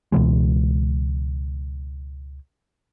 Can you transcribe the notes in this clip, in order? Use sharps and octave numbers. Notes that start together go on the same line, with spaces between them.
C#2 B2 E3 G#3